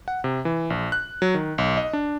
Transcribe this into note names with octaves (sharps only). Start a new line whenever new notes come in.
F#5
C3
E3
A#1
F#6
F#3
D#3
B1
D#5
D4